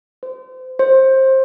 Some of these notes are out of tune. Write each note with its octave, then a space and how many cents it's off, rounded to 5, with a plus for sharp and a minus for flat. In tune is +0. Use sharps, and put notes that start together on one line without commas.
C5 -30
C5 +20